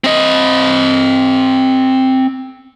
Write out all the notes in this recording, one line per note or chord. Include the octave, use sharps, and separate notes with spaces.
C4 D#5